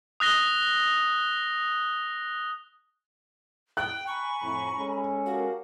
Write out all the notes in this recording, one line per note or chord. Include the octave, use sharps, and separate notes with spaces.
D#6 F#6 A#6 G7
G5 F#6
G#5 A#5 B5 C#6
F2 A2
G#3 C#4 A4
F#4 G4 A#4 F5